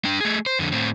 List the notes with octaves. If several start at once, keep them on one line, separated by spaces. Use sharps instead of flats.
D4 G5
A3 G#4
C5
F2 D3
A2 C4